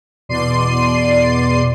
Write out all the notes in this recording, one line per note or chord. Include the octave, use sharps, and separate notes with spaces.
E2 B2 D5 C6 C7 D#7